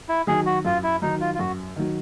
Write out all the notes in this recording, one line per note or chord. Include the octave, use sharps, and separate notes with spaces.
E4
D#3 F#3 G#4
F#4
F#2 F4
E4
D#3 F#3 D#4
F4
F4
F#2 F#4
D#3 F#3